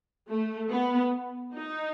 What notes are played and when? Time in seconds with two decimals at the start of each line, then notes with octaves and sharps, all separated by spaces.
0.29 A3
0.71 B3
1.55 D#4